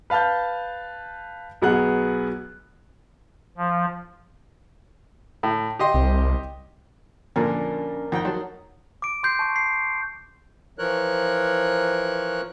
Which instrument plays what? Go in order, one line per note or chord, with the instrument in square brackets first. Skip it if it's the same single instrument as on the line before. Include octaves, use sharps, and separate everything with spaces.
[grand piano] B4 F5 A5 F6 G6
B1 F#3 B3 G#4 F#5 F#6
[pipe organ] F3
[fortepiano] A2
G4 D#5 C6
[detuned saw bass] C2
[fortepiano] F2 A#2 D3 [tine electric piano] C#4 D4 [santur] A#4
[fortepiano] F2 G5 [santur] D#4 F#5
[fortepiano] F#3 A5 [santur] C6
[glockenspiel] D6 D7
C6 G6 C7
A5 C#6
C7
[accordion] E3 F3 A#4 C#5 F#6